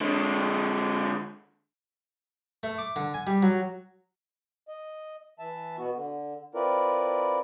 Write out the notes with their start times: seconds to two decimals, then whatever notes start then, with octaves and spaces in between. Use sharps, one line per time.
0.01 D3 G#3
2.63 A3
2.78 D6
2.96 D3
3.14 G#5
3.27 G3
3.43 F#3
4.68 D#5
5.39 E3 E5 A5
5.78 B2 B3 F#4
5.95 D3
6.55 C4 E4 F4 A#4 B4 D5